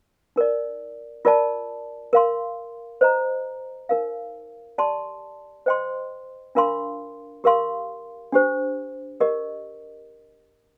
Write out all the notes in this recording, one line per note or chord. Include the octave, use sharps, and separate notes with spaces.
D#4 A#4 D5
F4 A#4 D5 A5
A#4 F5 C6
C5 D#5 A#5
D#4 A#4 F5
G4 D5 A5 C6
C5 D#5 G5 C6
D4 F4 A#4 F5 C6
G4 A#4 F5 C6
D4 G4 C5
G4 A#4 D#5